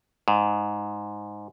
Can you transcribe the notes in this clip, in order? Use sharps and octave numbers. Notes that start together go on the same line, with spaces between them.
G#2